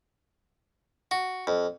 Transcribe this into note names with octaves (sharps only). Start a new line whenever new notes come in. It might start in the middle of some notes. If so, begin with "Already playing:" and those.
F#4
F2